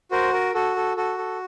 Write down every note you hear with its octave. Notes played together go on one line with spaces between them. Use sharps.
F#4 A#4 C5
A#4
F#4 A4
A4
F#4 A4
A4